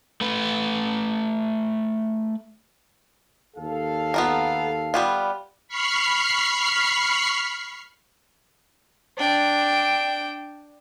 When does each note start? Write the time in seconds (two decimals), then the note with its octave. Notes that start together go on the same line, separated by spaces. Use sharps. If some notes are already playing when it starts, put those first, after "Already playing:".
0.21 A3 B4
3.56 D#2 A4 F5
4.14 B3 F4 A#4
4.94 G3 B3 F4
5.68 B5 C#6 F6 C7
9.18 D4 G5